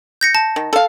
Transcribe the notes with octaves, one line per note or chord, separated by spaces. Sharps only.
G6 A#6 C#7
A5
D#3
A4 F5